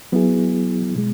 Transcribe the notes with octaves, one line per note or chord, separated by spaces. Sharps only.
F#3 B3 E4 G#4
B2 G#3